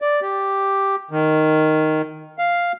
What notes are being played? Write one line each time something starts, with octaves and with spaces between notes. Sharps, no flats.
D5
G4
D#3
F5